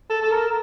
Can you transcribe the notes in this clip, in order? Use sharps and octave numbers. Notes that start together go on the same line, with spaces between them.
A4
A4
A#4